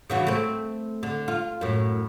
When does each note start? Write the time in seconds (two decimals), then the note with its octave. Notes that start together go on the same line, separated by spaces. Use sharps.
0.10 C#3 E3 F#4
0.27 A3 C4
1.03 D3
1.28 F4
1.61 F#2 A2